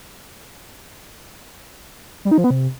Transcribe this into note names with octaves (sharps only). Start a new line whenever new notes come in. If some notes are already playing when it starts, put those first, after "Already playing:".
G3
D#4
F3
B3
C3